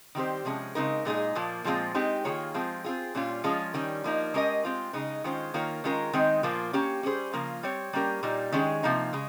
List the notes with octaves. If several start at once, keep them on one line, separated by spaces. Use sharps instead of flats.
D#3 G3 C4 G4 C5
C3 F3 G#3 C#4
C#3 G#3 C4 D#4 A#4
A#2 G#3 D#4 G#4
A#2 F3 A#3
A#2 F3 G#3 C4 F4
G#3 C4 D#4 G4
D#3 A#3 F4 G#4 C#5
F3 G#3 C4 F4
C4 F4 G#4
A#2 G3 C#4 F4
F3 G#3 C#4 F4
D#3 G3 C#4
F3 A#3 D#4
G#3 C#4 G4 A#4 D#5
G#3 C4 F4 C5
C#3 G#3 D#4
D#3 G#3 C#4 F4 C5
D#3 A#3 F4 A#4 C#5
D#3 G#3 C#4 F4 A#4
D#3 G#3 C4 D#4
A#2 F3 A#3 F4
A#3 C#4 G4 C#5
G3 C#4 G#4 C5
C#3 F3 A#3 F4 A#4
G3 C4 G4 C#5
G3 A#3 C#4 G4 A#4
A#2 G3 A#3 D#4
D#3 G#3 C#4 G#4
C3 F3 A#3 D#4
C#3 G#3